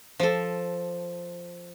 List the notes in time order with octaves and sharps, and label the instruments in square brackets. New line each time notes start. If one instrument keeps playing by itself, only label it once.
[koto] F3 A4